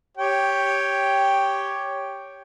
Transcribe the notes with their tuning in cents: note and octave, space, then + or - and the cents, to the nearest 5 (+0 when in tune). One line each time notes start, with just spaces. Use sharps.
G4 +0 C#5 +0 G5 +0